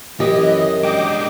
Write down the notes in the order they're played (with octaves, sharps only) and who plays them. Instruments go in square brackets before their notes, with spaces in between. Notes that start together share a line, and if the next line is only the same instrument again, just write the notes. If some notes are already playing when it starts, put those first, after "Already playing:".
[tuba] F#2 [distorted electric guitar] E3 [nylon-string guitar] G4 [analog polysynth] D#5
[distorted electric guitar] G#3 D4 [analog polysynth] D#5 G5 D6